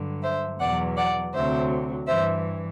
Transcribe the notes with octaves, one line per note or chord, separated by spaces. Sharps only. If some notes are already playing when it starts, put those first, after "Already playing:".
Already playing: G2 D3 F#3
C5 E5
E2 B2 F#3 D5 F#5
D5 F#5
D2 C3 F#3 C5 E5
G2 E3 C5 E5